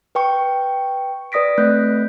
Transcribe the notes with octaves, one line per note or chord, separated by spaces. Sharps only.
B4 G5 C#6
B4 D5 D#6 A#6 B6 D7
A3 C4 B4 F#6 G6